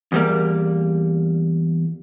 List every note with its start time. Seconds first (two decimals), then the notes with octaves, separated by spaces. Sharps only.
0.12 E2 G3 A#3